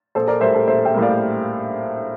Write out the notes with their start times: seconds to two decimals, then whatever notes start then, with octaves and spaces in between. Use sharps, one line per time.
0.15 A#1 A4 C5
0.28 A#4 D5
0.41 A2 G3 A#3 C5 E5
0.55 A4 C5
0.67 A#1 C5 E5
0.85 E5 G5
0.94 A2 G3 A#3
1.02 D5 F5